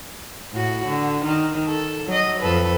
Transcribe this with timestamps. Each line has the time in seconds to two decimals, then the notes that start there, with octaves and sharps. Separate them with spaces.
0.52 A2 F#4
0.86 D3
1.25 D#3
1.67 A4
2.07 F#3 D#5
2.40 F2 A4 B4